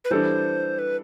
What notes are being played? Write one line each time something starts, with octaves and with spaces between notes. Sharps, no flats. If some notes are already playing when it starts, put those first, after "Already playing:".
B4
E3 G3 D4 A4 C5
B4